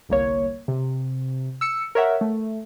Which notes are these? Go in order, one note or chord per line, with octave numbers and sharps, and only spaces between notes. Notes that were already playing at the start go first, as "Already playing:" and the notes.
G1 C2 A#3 C#5
C3
E6 C#7
A#4 C#5 E5 F#5
A3